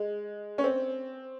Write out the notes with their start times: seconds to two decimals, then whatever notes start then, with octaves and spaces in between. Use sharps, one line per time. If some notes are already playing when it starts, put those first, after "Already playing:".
Already playing: G#3
0.58 C#4
0.64 C4